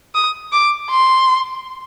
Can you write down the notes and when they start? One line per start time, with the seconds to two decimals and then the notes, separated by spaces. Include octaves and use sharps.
0.15 D#6
0.52 D6
0.91 C6